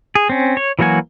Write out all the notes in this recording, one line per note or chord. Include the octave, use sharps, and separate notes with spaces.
G#4
C4 C#4
C#5
E3 F#3 A#3 F#4 G#5